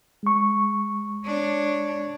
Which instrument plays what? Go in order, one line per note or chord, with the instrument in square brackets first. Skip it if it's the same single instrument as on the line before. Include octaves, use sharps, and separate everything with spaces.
[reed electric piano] G#3 C#6
[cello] D4 C#5